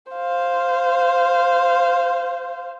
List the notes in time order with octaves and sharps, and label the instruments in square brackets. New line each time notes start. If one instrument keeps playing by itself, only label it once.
[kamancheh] C5 F5